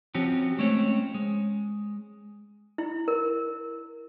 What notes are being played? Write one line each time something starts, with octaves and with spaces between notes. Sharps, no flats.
F3 C4 C#4 F#4 G4
G#3 A3 C4 C#4 C#5
G#3
E4
A#4